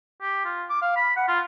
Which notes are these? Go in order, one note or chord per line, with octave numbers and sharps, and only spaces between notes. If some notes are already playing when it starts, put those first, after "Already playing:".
G4
F4
D6
F5
B5
F#5
F4